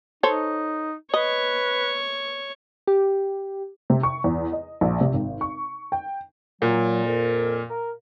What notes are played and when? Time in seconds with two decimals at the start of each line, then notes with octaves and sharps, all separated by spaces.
0.23 D#4 A4 C5 C#5
1.14 B4 C#5 D#5 C#6
2.87 G4
3.90 C3
4.03 C#6
4.24 E2
4.52 D#5
4.81 A#1
5.01 C3
5.14 G#1
5.41 C#6
5.92 G5
6.62 A#2 F#3
7.04 F2 A#4
7.69 A#4